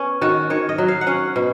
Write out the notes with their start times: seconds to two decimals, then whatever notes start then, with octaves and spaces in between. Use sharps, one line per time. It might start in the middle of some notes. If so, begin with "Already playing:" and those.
Already playing: B3 C#4
0.21 D#3 F#4
0.50 D#3 C#5
0.69 D#5
0.78 F#3
0.88 F5
1.01 F#5
1.07 C#4 F5
1.36 B2